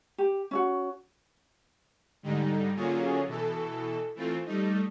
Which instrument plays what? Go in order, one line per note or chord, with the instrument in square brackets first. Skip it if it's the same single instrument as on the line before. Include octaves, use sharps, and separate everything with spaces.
[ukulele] G4
C#4 E4 F#4
[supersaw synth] G#2 D3 G3 D#4
D3 F#3 A#3 C#4 F4 G#4
B2 E3 A4
E3 A3 C4 F4
G3 A3 D#4